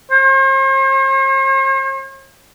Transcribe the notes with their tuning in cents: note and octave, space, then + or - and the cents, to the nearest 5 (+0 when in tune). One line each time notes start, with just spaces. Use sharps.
C5 +45